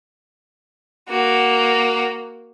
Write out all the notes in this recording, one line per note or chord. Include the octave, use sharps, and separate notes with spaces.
A#3 F#4